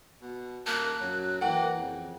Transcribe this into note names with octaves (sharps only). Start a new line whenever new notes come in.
B2
D#1 A#3 A5 F#6
F#2 F#3
E3 A#3 F#5 G5
F2 C#3